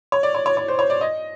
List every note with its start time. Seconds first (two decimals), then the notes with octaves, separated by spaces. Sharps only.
0.12 C#5
0.23 D5
0.35 C#5
0.46 C#5
0.57 C#5
0.68 C5
0.79 C#5
0.90 D5
1.01 D#5